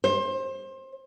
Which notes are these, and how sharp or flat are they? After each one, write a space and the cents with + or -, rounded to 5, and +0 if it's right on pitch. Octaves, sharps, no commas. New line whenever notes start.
C5 +25